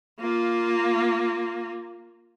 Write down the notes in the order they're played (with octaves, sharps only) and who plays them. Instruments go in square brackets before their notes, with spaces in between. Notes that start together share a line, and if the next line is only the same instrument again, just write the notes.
[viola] A#3 F4